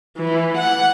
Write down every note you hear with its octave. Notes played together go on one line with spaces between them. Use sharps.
E3
F#5